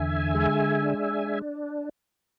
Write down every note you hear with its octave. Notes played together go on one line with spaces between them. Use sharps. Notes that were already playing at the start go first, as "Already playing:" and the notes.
Already playing: E2 D3 E5 G#5
G#3
D4